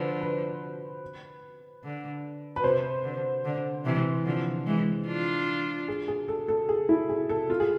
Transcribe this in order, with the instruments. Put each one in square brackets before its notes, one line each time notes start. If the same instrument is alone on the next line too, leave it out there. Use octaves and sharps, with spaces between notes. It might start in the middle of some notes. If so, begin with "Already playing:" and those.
Already playing: [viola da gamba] D3 F3 [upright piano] B4 C5
[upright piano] B4
[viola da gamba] D3
[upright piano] B4
[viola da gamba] C3 [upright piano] C5
[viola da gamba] D3
D3
C3 E3
D3 F3
E3 G#3
D4 F4
[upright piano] G#4
G#4
A4
A4
G#4
E4
G#4
A4
F4
G#4